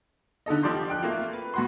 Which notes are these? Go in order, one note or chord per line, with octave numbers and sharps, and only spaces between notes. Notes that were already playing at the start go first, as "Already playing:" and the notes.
D3 D#4 A4 D#5
F3 G4 D5 C6 G6
G5 F#6
A3 A#3 F4
B4
A2 F#4 C6